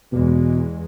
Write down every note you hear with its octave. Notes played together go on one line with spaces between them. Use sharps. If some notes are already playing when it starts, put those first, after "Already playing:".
E2 B2 G#3